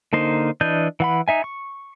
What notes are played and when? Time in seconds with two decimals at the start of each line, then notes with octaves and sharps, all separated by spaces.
0.13 D3 A#3 D#4 C5
0.61 E3 D4 D#5 G6
1.00 E3 F#5 B5
1.28 D#4 E5 G#5
1.44 C#6